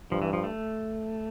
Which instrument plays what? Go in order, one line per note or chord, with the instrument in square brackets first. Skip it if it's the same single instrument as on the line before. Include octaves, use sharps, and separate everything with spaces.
[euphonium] G2 [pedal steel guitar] F3
[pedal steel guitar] E3
F3
A3